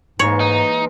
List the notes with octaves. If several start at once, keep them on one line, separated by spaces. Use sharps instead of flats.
G#2 E3 G#3 A#3 C#5
D#4